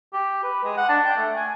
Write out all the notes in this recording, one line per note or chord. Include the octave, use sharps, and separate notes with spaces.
G4
B4
G#3
F#5
D4
G5
A3
G#5